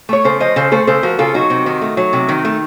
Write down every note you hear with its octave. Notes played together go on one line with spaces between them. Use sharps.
A3 C#5
C#3 A4 C5
F3 C5 D#5
C#3 A4 C5
A3 A4 C5
C#3 A4 C5
F3 F#4 A#4
C#3 F4 A4
F#3 D#4 F#4
C3
D#3
A3
F#3
C3
D#3
A3